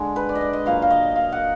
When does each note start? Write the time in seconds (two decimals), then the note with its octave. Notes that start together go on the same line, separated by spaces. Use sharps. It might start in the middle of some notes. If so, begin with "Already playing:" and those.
Already playing: D3 G#3
0.16 B4
0.29 D5
0.35 D#5
0.41 D5
0.53 D#5
0.66 A#2 F#3 F5
0.82 F5
0.90 D#5
1.16 F5
1.32 F#5